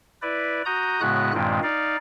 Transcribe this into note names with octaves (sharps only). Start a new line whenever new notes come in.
E4 B4 D5
F#4 A#5 D#6 G6
A2 C#3 G#3 B3 F#4 F#6
G2 A#2 D#3 G#3 C4
D#4 D5 F5